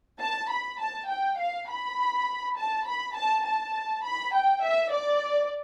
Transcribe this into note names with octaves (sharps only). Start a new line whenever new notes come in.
A5
B5
A5
G5
F5
B5
A5
B5
A5
A5
B5
G5
E5
D5